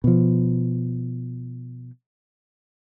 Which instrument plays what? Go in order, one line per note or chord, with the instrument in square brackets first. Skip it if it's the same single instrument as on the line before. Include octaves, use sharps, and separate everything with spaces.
[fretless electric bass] B2 F3